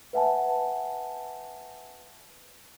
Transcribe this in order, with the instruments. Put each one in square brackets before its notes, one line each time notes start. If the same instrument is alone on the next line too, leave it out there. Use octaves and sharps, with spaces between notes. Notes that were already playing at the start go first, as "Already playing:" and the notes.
[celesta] B4 E5 F#5 G#5 A5